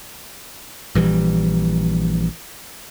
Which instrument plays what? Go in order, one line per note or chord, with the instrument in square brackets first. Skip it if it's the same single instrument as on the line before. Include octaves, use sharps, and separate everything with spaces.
[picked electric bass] A#1 E3 G3